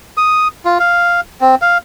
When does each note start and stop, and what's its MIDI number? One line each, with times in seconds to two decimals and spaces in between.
0.17 0.48 87
0.65 0.78 65
0.80 1.21 77
1.41 1.55 60
1.62 1.78 77